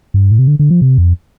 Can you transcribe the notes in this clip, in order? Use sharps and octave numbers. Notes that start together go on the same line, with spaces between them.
G2
A2
C3
D3
D3
F3
C3
F2